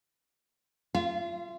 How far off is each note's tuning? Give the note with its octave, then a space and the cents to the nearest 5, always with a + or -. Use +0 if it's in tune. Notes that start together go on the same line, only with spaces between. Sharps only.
F4 -15 F5 -45